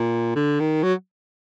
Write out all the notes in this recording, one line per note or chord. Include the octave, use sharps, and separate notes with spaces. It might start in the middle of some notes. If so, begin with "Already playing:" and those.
Already playing: A#2
D3
D#3
F#3